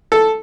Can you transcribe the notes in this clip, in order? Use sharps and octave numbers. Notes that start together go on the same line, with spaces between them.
A4